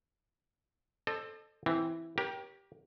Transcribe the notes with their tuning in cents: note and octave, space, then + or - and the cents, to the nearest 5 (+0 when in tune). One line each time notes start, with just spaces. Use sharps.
A4 +0 C5 +20 D#5 -45
E3 +0 C4 +0 G4 +0
G4 +0 A#4 +35 C#5 +0